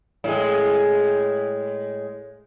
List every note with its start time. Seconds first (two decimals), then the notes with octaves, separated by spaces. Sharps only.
0.24 A2 G#3